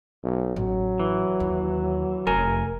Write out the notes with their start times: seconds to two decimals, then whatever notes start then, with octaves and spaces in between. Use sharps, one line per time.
0.23 B1
0.56 A1 F#3
0.99 E3
1.40 D#2
2.27 F1 A#4 G#5